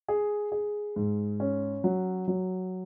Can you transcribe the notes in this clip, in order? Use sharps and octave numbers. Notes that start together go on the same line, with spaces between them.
G#4
G#4
G#2
C#4
F#3
F#3